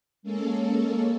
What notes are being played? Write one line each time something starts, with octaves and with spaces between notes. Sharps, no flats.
G#3 A#3 C#4 A4